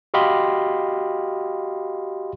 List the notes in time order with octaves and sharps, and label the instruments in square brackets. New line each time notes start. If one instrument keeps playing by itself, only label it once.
[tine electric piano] F#4 G4 D#5 F5 B5 C6